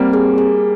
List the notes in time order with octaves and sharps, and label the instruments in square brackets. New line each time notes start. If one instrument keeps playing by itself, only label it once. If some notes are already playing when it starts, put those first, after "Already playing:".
Already playing: [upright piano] G3 A#3 [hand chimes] C4
[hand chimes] G#4
G#4